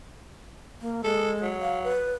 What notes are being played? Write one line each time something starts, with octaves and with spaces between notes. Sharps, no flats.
A#3
G#3 A4
F#3
F5
B4